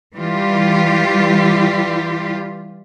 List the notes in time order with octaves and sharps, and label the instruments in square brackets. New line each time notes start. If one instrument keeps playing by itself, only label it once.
[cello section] E3 G3 F4 G4